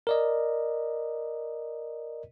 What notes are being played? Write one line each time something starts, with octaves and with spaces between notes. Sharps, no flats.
A#4 D5 D#5